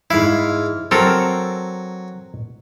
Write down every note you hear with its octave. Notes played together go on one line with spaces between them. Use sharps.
G#2 E4 F5
F#3 C4 A4 A#4